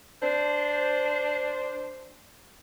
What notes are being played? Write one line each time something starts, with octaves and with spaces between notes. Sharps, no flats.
D4 C5